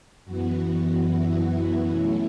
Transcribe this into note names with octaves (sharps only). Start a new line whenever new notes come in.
F#2 E3 B3 F#4
E4
B2 F#3 A3 C#4 E4